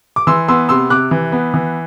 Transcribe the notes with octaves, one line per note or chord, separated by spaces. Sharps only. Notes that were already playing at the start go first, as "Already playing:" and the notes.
D6
E3 C6 E6
B3 C6 E6
C3 C6 E6
C3 D6 F#6
E3
B3
E3